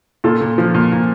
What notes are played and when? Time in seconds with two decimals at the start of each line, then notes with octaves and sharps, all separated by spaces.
0.24 A#2 F4 A4
0.41 A#2
0.58 F3
0.75 A#2
0.92 A#2